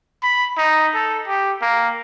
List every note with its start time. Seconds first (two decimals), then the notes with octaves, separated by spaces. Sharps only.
0.23 B5
0.58 D#4
0.95 A4
1.27 G4
1.62 A#3